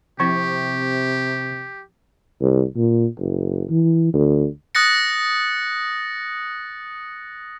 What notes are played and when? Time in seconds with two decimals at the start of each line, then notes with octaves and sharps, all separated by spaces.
0.20 C3 F3 C4 E4 G4 C#6
2.41 C2
2.76 A#2
3.19 F#1
3.70 E3
4.13 D2
4.75 D#6 F#6 A6 A#6 C#7